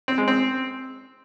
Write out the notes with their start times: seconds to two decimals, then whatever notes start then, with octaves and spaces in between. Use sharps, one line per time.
0.08 C4
0.18 G#3
0.28 C4